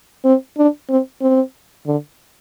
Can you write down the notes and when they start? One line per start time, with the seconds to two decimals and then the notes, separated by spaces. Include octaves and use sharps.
0.25 C4
0.58 D4
0.89 C4
1.21 C4
1.86 D3